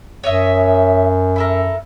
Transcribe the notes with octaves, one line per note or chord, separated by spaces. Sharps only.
F#2 C#5 D#5 E5
E4 A4 A#4